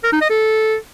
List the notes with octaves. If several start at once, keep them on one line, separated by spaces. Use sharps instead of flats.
A#4
D#4
D#5
A4